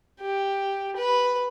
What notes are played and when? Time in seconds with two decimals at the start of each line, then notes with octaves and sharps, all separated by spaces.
0.21 G4
0.97 B4